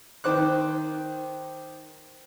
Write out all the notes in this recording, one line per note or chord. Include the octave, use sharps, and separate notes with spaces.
D#3 C5 D6 F#6